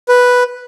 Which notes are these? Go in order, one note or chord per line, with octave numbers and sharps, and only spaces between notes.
B4